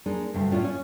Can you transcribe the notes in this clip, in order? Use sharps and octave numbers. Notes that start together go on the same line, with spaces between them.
G#3 A#3 D4 D#4
D2 G2 C3
A2 C#4 D4 F4
C#4